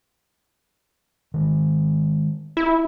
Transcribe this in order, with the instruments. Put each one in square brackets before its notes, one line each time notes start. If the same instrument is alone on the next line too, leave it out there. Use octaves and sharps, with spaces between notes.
[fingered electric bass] D#3 G#3
[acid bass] E4